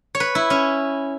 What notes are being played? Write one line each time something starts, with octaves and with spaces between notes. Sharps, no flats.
C#5
B4
E4
C#4